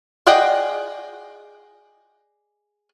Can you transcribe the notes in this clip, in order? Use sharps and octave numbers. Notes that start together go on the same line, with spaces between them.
G#4 D5 D#5 F#5 G5